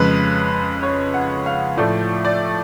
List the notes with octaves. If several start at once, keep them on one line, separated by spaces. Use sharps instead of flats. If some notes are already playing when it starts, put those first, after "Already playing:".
Already playing: F2 C#3 G#3 B4
C#5
F#5
F5
A2 F3 A3 D5
D5